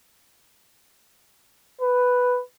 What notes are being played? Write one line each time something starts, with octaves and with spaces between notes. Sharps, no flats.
B4